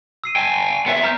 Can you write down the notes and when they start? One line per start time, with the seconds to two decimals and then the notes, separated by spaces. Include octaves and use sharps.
0.24 E6 C7 D#7
0.36 G5 G#5
0.86 B3 E5
1.03 A#5 F6 G6